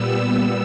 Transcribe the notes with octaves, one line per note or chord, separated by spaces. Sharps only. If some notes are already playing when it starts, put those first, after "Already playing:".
Already playing: A#2 G3 B3 E6